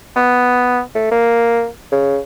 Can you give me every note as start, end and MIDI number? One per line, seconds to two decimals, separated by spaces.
0.16 0.81 59
0.95 1.08 57
1.11 1.67 58
1.92 2.18 49